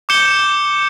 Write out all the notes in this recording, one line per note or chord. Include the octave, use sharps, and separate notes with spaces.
D6 G6 C#7 E7 G7